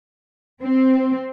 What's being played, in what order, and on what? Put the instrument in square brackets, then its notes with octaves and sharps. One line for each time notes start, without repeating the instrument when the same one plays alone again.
[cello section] C4